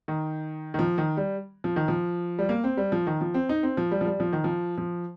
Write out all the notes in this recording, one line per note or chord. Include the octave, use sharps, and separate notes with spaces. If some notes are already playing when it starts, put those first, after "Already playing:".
D#3
D#3
F3
D#3
G3
F3
D#3
F3
G3
A#3
C4
G3
F3
D#3
F3
C4
D#4
C4
F3
G3
F3
G3
F3
D#3
F3
F3